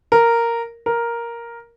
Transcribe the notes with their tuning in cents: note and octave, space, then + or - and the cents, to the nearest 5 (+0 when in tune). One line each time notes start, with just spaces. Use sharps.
A#4 -5
A#4 +5